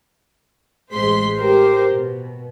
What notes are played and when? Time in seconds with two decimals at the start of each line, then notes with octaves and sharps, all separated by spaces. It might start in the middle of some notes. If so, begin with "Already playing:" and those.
0.93 A1 G#3 C5 C6 B6
1.39 G4 A#4 C5
1.94 B2